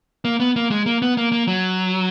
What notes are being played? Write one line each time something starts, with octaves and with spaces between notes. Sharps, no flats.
A#3
B3
A#3
G#3
A#3
B3
A#3
A#3
F#3